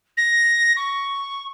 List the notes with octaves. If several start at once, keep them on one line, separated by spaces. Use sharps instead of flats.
A#6
C#6